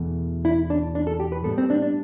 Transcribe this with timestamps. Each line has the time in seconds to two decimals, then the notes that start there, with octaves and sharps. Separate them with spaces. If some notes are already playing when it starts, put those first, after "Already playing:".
Already playing: E2 B2 A3
0.45 E4
0.70 D4
0.95 D4
1.07 A4
1.20 G4
1.32 B4
1.44 A2 G3 B3 A4
1.58 C4
1.70 D4
1.82 D4